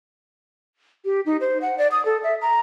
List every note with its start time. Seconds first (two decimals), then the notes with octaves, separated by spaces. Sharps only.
1.05 G4
1.26 D#4
1.41 C5
1.62 F#5
1.78 D5
1.91 D#6
2.05 A4
2.24 E5
2.42 A#5